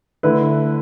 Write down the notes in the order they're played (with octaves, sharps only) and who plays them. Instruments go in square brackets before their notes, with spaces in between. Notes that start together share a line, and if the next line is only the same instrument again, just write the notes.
[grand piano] D3 A3 E4 B4